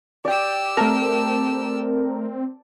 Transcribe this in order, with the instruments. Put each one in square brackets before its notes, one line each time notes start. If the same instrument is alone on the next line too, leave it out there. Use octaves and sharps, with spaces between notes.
[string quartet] G4 E6 [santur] D5 G5
[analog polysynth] A3 A#4 [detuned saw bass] C4 [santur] A5